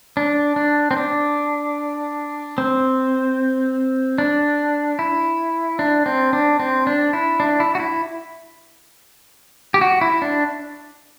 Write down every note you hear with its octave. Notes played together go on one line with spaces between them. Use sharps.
D4
D4
C4
D4
C4
D4
E4
D4
C4
D4
C4
D4
E4
D4
E4
F#4
E4
G4
F#4
E4
D4